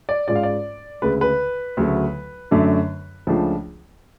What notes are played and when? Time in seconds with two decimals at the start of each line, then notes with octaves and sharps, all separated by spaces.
0.09 D5
0.28 G#2 G#3 C#4 F4 D5
0.36 F5
0.43 D5
1.02 D2 C#3 G#3 B4
1.21 B4
1.77 D2 C#3 F#3 A3
2.51 F#2 D3 F#3 A3 D4
3.27 C#2 C#3 F3 A3 D4